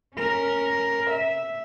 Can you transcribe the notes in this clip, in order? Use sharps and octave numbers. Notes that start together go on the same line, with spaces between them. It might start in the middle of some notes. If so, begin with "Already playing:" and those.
C#4 A#4
E5